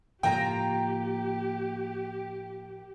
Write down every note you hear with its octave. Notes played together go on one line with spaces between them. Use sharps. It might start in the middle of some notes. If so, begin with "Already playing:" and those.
A2 C#3 F3 A#3 F4 G4 G5 A#5